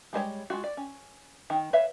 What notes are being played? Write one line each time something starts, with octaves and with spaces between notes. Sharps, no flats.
G3 G#3 C5 C#5
G#3 F4 F#4
D5
C#4
D#3
B4 C#5 E5 F5